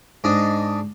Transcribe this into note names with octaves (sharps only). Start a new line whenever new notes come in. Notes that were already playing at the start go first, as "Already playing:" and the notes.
G#2 D4 D#5